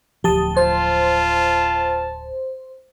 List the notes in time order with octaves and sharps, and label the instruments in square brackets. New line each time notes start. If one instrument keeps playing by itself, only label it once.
[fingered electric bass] D1 F3 [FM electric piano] G4 A5 D#6
[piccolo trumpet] F4 [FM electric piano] C5 [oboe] A5